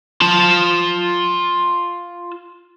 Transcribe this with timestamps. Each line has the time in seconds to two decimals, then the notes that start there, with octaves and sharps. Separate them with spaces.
0.21 F4 A5